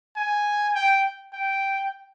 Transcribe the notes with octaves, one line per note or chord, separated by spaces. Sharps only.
G#5
G5
G5